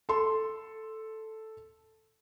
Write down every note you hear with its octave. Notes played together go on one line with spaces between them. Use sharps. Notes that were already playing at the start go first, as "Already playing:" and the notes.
A4 C6